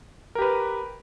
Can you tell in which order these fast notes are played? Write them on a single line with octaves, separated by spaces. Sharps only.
A#4 G4 B4